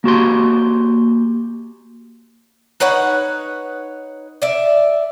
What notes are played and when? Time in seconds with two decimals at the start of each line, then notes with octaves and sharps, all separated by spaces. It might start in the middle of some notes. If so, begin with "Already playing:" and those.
0.04 A#3 F#4 G4 C6
2.80 D#4 B4 C#5 F#5
4.42 D5 E5